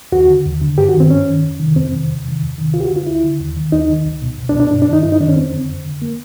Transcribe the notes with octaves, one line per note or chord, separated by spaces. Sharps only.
D#2 F#4
D3
D#2
D3
G2 G4
F#4
D#3
C4
G2 C#4
D#3
F2
C3 D#3
F2 C4
C3 D#3
E2
C3 D#3
E2
C3 D#3
D2 F4
G4
F#4
D3
F4
D2 E4
D3
D#2
D#3
D#2 D#4
D#3
C#2
B2
C#2
D4
B2
D4
G2 D4
D4
D#3
D#4
G2 E4
D#4
D#3 D4
C#4
F2 C4
D3
F2
D3
A#3